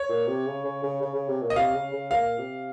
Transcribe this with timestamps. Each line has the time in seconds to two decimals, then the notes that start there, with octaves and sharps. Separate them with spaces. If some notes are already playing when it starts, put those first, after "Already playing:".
Already playing: C#5
0.09 A#2
0.27 C3
0.47 C#3
0.65 C#3
0.83 C#3
1.02 C#3
1.15 C#3
1.29 C3
1.42 A#2
1.50 D#5
1.56 C3 F5
1.75 C#3
1.93 C#3
2.11 A#2 F5
2.38 C3